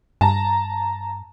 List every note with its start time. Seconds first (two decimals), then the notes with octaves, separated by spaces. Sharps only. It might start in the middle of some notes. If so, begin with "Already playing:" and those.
0.21 G2 A5 A#5